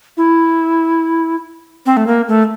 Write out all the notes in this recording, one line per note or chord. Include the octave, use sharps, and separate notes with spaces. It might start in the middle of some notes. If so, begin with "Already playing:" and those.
E4
C4
A3
A#3
A3